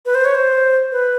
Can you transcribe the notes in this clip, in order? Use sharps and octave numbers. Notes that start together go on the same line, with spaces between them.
B4
C5
C#5
C5
B4